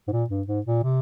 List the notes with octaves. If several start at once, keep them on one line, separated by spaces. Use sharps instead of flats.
G#2
A#2
G2
G#2
A#2
C3